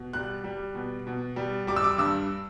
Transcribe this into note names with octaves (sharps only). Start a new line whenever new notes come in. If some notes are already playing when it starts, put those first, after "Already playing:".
Already playing: B2
G3 F#6
G3
B2
B2
G3
G3 D6
E6
D6
G2 E6